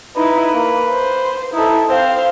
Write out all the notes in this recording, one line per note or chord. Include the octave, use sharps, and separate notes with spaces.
D#4 E4 B4
A#3
C5
D#4 E4 A4
C4 C5 F5